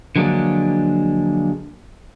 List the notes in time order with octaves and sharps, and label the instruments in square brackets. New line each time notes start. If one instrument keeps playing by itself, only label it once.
[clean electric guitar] D3 F3 F#3 G#3 A#3 D4